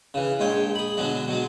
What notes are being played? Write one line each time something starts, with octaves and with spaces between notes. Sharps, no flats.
C#3 E3
A#1 G#3 C#5 G5
G#4 B5
B2 D3 F#3 G#3
B2 F#3 G#3